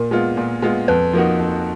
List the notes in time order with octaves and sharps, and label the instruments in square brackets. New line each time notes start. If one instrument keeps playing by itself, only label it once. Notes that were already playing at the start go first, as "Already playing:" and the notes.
Already playing: [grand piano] A#2 [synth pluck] A#4
[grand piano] G#3 B3 F4
A#2
G#3 B3 F4
[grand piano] F2 [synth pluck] B4
[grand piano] F3 A#3 D#4 F#4
F2